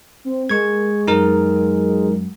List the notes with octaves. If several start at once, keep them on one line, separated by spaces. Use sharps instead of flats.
C4
G#3 A#3 C#6 G#6
F#2 D#4 A#4